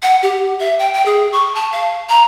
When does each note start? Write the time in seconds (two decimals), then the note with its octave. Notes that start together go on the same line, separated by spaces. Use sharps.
0.02 F#5
0.23 G4
0.60 E5
0.79 G5
0.93 G5
1.06 G#4
1.32 C#6
1.55 A5
1.72 F5
2.09 A#5